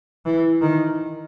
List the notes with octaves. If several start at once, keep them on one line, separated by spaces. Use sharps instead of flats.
E3
D#3